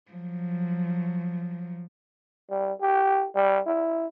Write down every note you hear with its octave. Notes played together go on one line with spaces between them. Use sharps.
F3 F#3
G3
G4
G3
E4